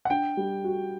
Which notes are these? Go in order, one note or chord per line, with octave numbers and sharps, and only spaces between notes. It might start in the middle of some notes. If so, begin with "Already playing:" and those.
F#5
D4 G5
G3
F#4